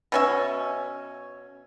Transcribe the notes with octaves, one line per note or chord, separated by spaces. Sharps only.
B2 C#4 E5